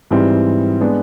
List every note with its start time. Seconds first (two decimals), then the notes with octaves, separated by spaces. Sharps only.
0.11 G#2 E3 G3 C4 E4
0.81 G#3 B3 D4